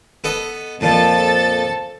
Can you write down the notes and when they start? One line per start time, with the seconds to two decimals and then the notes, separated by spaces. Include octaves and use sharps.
0.24 B3 A4 D#5
0.81 F2 A#2 F3 A4 A5 A6